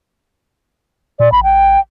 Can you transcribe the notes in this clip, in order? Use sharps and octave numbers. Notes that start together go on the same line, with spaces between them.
A#2 D5
A1 B5
G5